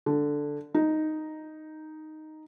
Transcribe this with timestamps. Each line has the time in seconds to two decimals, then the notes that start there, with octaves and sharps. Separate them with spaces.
0.06 D3
0.74 D#4